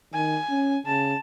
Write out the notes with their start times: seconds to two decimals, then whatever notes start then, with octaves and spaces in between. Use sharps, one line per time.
0.14 D#3 G#5
0.50 C#4
0.86 C#3 A5